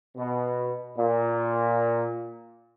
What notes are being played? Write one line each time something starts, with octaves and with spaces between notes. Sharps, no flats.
B2
A#2